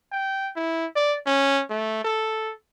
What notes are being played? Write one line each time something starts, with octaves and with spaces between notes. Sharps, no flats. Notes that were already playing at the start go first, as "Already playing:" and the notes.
G5
E4
D5
C#4
A3
A4